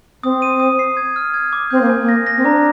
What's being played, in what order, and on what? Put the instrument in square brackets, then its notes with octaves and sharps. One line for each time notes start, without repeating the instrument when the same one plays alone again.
[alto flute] C4 [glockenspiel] D#6
[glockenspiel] D#7
D#6
C7
G#6
F6
G#6
D6
[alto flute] C4 [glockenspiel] G6
[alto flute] A#3
[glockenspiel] G#5
[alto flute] A#3
[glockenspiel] A#6
A#6
[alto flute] C4
[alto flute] D4 [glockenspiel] A#5